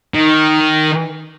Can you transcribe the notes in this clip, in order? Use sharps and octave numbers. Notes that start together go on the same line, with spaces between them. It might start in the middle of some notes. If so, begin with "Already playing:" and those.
D#3